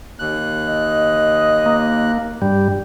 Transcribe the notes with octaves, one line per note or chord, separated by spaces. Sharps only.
D#2 F#6
D#5
A#3
G2 G3